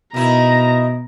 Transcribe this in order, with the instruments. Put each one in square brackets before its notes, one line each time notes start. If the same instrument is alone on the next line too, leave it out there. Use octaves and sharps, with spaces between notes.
[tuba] B2 [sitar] D#3 E4 [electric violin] A#5